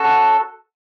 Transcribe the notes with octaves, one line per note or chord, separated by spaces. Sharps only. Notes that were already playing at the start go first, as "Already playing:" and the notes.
Already playing: C#4 F#4 A4